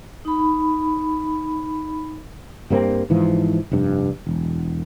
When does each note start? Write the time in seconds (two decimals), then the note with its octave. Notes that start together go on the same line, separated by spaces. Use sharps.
0.25 D#4 B5
2.70 G2 G3 A#3 C4
3.10 G#2 E3 F3
3.72 F1 G2
4.27 E1